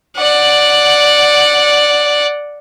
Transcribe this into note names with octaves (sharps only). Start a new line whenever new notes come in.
D5 F#5